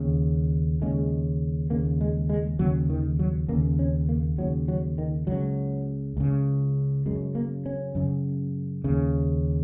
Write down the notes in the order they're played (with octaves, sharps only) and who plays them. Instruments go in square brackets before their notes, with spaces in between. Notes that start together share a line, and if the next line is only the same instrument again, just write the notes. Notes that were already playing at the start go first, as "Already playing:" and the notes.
Already playing: [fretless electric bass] D#2 C#3
D#2 C#3 G#3
D#2 C#3 A#3
G#3
G#3
D#2 C#3 F#3
D#3
F#3
D#2 C#3 A#3
C#4
A#3
D#2 C#3 F#3
F#3
D#3
C#2 C#3 F#3
C#2 C#3
F#2 C#3 G#3
A#3
C#4
F#2 C#3
D#2 C#3